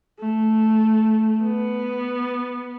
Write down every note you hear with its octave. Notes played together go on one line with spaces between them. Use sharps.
A3
B3